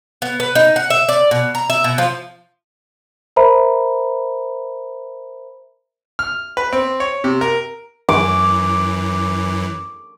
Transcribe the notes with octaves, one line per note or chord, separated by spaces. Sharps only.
B3
B4
D#4
F#5
E5
D5
B2
A#5
E5
B2
F3
A#4 C5 E5 A#5 B5
F6
B4
C4
C#5
C3
A#4
F#2 E3 D6